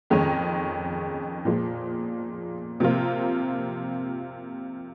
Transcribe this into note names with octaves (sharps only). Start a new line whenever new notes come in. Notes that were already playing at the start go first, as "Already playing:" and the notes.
F2 D#3 G#3 C#4
A#2 F3 G#3
C3 F3 A#3 F4